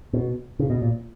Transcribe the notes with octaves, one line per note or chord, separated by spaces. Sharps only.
B2
C#3
B2
A#2